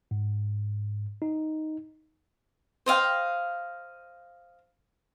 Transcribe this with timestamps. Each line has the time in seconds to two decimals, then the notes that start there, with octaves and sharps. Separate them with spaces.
0.11 G#2
1.22 D#4
2.86 C5 D#5 F5 G5